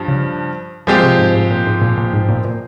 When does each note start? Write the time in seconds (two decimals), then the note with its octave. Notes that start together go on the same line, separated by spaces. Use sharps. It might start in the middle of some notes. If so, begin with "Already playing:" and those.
Already playing: G2 F3
0.08 C#3
0.87 A#2 F3 G#3 C4 G4
1.03 C3
1.19 G#2
1.35 G#2
1.50 A#2
1.67 G#2
1.82 A#2
1.98 A#2
2.13 G#2
2.29 A#2
2.45 A#2